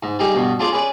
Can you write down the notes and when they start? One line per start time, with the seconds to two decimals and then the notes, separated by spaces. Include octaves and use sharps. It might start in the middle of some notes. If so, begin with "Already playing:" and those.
0.03 G#2
0.19 G3 D#4 G4 G#4
0.33 G2 B2
0.59 D4 F4 G#4 C5 D5
0.72 C#4 G#4 B4 D5